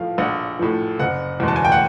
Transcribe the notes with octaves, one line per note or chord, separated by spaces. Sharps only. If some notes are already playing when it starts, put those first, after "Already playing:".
Already playing: A2 F3 F5
A#1 F#5
A2 F3
F#1 F#5
E2 B2 G#3
A5
G#5
G5
F#5